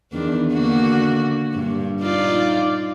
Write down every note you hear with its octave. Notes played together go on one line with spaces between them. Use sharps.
E2 D#3 D4
D3 A#3 F#4
G2 A#2
D#4 F4 D5